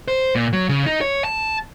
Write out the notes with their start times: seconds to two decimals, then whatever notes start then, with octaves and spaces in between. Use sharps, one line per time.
0.08 C5
0.35 A#2
0.53 F#3
0.69 C#3
0.86 D#4
1.01 C#5
1.24 A5